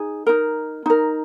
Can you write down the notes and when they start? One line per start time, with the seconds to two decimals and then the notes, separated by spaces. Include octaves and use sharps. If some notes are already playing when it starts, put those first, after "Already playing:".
Already playing: D#4 G#4
0.27 D#4 A#4
0.86 D#4 A#4